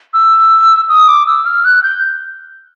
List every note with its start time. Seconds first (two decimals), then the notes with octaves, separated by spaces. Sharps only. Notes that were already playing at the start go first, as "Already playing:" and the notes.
0.13 E6
0.89 D#6
1.08 D6
1.27 E6
1.45 F6
1.65 F#6
1.83 G6